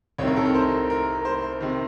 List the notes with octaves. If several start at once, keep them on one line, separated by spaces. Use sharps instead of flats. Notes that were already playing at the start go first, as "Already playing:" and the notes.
C2 C3 D#3 C#5
A#4
A4
A#4
C5
A#4
C5
C3 D#3